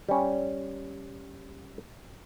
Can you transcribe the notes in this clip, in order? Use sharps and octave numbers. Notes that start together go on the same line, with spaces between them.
G3 C#4